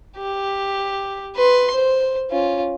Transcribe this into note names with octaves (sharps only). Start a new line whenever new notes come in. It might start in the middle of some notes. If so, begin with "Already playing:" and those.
G4
B4 C6
C5
C#4 F4